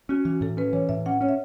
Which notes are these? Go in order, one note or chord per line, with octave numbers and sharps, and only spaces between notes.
C#4 F#4
E3 F#4
A2 A4
C#4 B4
E3 C#5
A2 E5
C#4 F#5
C#4 C#5
E5